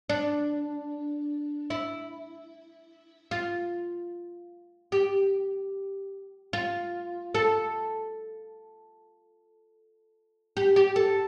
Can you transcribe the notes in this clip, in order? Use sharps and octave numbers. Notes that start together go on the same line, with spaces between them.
D4
E4
F4
G4
F4
A4
G4
G4
A4